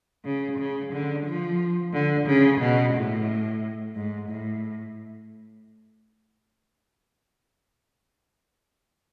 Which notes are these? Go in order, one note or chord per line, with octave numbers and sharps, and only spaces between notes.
C#3
C#3
D3
F3
D3
C#3
B2
A2
G#2
A2